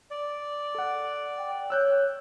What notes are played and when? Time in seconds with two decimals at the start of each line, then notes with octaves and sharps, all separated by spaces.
0.11 D5
0.75 A4 F#5
1.38 G5
1.70 C#5 E6 F#6 G6